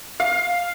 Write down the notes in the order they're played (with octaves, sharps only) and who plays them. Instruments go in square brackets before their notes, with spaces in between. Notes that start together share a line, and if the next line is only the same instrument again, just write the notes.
[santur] F5